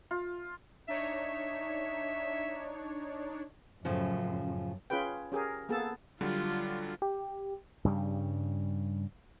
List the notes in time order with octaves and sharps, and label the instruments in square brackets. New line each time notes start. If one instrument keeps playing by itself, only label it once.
[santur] F4
[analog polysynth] D4 D#4 C#5 [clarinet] E5
[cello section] F#2 [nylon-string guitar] A2 C#3 F3
[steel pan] C#4 F4 G#4 B4 G5
C#4 G4 G#4 A#4
A#3 B3 G#4 A4 A5
[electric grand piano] D3 F#3 G3 [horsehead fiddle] F4
[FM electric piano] G4
[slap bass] G2 C#3 G3